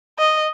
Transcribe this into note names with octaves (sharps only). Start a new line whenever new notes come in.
D#5